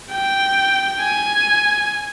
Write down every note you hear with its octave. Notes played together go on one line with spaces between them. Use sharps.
G5
G#5